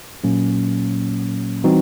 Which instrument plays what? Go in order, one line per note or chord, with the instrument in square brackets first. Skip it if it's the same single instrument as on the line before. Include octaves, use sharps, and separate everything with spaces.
[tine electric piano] A#2 F#3 A#3 C#4
E3 G3 C4 D#4 F#4